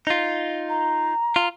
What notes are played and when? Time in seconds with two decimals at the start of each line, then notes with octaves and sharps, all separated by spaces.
0.07 D#4 F4
0.69 A#5
1.36 F4